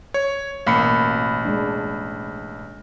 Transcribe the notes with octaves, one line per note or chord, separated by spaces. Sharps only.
C#5
A1 B2 A#3 F5 B5 C#7
G#3 D4